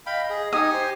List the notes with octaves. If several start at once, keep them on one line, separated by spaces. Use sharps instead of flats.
D#5 F5 G5 B5
G#4
D#4 G4 G#5 D#6
C5